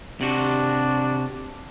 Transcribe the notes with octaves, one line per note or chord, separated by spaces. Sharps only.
C3 D4 F#4